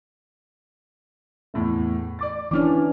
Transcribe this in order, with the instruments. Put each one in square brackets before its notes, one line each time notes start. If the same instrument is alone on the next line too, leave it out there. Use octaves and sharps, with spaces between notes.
[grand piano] E2 A2 A3
D5 D6 A6
[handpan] E3 C#4 D4 [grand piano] D6 F6